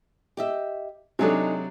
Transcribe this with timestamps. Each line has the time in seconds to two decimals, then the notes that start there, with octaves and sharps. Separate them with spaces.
0.37 G4 D#5 E5
1.19 C3 F#3 G#3 D4 D#4 A4